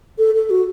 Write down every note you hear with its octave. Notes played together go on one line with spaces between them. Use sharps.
A4
A4
F#4